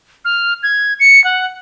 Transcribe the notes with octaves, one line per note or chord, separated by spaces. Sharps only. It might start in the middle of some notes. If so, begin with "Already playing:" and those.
F6
G#6
C#7
F#5